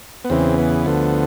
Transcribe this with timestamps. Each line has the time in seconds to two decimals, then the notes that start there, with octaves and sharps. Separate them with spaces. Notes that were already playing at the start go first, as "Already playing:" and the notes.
0.25 B3
0.30 E2 C#3 E3 C4
0.58 B3
0.86 D2 D3 F3